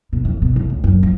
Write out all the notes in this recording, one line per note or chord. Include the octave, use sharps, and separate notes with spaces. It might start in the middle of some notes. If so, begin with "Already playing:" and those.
B2
F2
B2
F1
C#2
F#2
F3